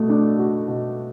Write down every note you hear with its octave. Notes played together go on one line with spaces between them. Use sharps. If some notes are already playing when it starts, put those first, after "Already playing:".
Already playing: B2 A3
D4
F#4
B2